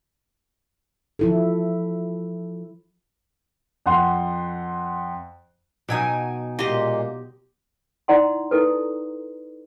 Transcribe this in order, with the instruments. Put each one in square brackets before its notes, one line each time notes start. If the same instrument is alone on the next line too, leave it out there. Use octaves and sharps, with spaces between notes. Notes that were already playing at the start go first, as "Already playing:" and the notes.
[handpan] F3 E4 A4
[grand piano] F2 F#5 C6
[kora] B2 F#3 D#4 [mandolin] G5 G#5 D#6
[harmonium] A#2 G#3 A#3 [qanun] G4 D#5 [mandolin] C6
[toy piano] D#4 E4 D5 F#5 A#5 C6
D#4 E4 A4 B4